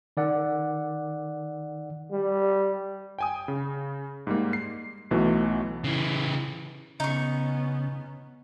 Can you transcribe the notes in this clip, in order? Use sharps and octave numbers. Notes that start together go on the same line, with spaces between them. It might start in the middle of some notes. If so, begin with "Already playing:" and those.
D#3 D5 F#5
G3
G5 G#5 D#6
C#3
G#2 G3 A#3
C7
B1 B2 E3 F#3 A3
C#3 E3
C#3 B3 C#4 D#4 C#6